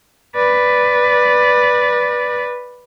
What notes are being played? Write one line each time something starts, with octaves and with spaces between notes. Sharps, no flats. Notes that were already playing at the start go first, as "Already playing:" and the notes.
B4 D5